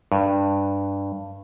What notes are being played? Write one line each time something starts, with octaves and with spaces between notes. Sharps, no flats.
G2